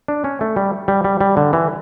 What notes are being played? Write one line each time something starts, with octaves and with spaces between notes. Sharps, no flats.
D4
C#4
A3
G3
G3
G3
G3
D3
E3